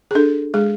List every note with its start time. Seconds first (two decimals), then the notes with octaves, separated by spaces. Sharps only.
0.11 G#4
0.15 D4 A4
0.54 G#3 G#4